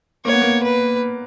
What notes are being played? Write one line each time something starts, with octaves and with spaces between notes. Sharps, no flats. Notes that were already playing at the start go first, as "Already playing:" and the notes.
A#3 C#5
B3
A#3
B4